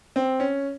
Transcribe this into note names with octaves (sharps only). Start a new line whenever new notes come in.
C4
C#4